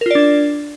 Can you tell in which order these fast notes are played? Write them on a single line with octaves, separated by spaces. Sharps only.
A#4 F4 D5 D4